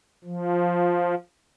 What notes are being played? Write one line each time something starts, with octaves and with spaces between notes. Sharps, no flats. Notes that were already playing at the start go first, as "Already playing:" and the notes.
F3